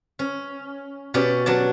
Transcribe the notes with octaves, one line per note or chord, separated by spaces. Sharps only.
C#4
B2 C#4 G4 D5
F#3 D4 D5 A5